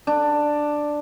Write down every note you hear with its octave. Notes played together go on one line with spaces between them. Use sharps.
D4